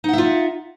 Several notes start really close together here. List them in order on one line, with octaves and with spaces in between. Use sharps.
D#4 F#5 E5 F4